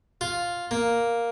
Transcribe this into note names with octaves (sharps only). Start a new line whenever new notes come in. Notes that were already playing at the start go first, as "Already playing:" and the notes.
F4
A#3